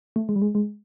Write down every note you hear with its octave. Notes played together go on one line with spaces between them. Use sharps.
A3
G#3
G3
G#3
G#3